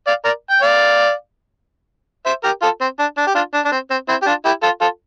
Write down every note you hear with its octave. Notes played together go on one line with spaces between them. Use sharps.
D5 F5
A#4 D5
G5
D5 F5
C5 E5
G4 A#4
F4 A4
C4
D4
D4
G4
D4 F4
D4
D4
C4
C4
C4 E4
G4
D4 F4
E4 G4
F4 A4
F4 A4